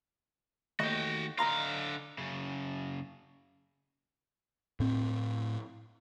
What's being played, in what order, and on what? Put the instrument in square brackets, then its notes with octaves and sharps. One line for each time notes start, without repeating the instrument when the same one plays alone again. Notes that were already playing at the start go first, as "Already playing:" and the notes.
[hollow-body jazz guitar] D#2 A3 D#5 [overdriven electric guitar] F#4 G5
[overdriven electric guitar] D3 F5 [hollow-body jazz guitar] D#5 A#5 C6
[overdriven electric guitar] F#2 C#3
[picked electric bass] A2 C4